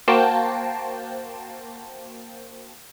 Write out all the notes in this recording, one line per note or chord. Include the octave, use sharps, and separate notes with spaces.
A#3 F#4 C5 G5 A5